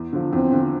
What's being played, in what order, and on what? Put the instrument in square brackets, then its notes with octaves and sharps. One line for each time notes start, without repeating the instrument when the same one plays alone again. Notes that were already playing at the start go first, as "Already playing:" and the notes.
Already playing: [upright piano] E2
D3 F3
[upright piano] E2 [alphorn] C4
[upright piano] D3 F3